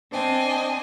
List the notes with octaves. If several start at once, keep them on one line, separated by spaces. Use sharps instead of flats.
C4 D4 D#5 G#5